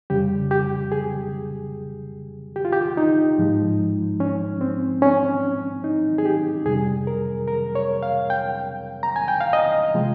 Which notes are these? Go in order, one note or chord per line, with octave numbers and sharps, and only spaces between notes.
F2 C#3 G3 G4
G4
G#4
G4
F4
G4
D#4
G#2 F3 G#3
C#4
C4
C#4
D#4
G#4
G4
F2 C3 G3 G#4
A#4
A#4
C#5
F5
G5
A#5
G#5
G5
F5
D#5
C3 F3 G#3